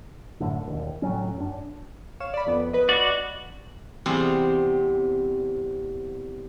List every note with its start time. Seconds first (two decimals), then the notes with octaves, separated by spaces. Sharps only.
0.40 F#2 A2 D3
0.66 E1 D#2
1.02 C#2 A2 F#3 C#4
1.37 F#2 D4
2.20 C#5 F5 E7
2.34 D5 B5
2.47 F2 B3
2.73 B4 D#5
2.89 F#4 D5
4.06 E2 C3 G3 C4